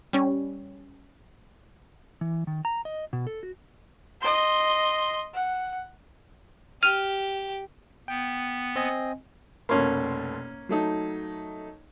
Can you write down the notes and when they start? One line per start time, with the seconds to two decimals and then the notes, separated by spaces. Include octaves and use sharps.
0.13 G3 C#4
2.21 E3
2.47 D#3
2.65 A#5
2.85 D#5
3.13 B2
3.27 A4
3.43 F#4
4.22 D#5 C6
5.34 F#5
6.83 G4 F6 D#7 F7
8.08 B3 G5
8.76 C4 D#5 G#5
9.69 F1 B2 A#3 C#4 C6
10.69 F#3 A3 D#4